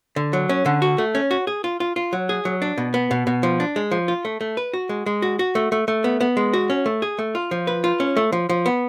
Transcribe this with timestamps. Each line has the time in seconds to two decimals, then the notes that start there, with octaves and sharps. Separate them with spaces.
0.16 D3
0.33 F#3
0.49 C#4
0.66 D3
0.82 F#4
0.98 A3
1.15 C#4
1.31 F#4
1.47 G#4
1.64 F4
1.80 F4
1.96 F4
2.13 F#3
2.29 G#4
2.45 F#3
2.62 D4
2.78 B2
2.94 B3
3.11 B2
3.27 B2
3.43 F3
3.60 D4
3.76 G#3
3.91 F3
4.08 F4
4.25 A3
4.41 A3
4.57 B4
4.74 F#4
4.89 G#3
5.06 G#3
5.22 F#4
5.39 F#4
5.55 A3
5.72 A3
5.88 A3
6.04 B3
6.21 B3
6.37 G#3
6.53 F#4
6.70 C#4
6.86 A3
7.02 G#4
7.19 A3
7.35 F4
7.51 F3
7.67 B4
7.84 F4
8.00 C#4
8.17 A3
8.32 F3
8.49 F3
8.66 B3